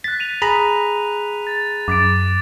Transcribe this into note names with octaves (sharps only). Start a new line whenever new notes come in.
F#6 A6 B6
D#7 F7
G#4 A#5 B5
A6
F#2 D6 A6 D7